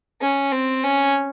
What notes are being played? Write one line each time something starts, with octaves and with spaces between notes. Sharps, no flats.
C#4
C4
C#4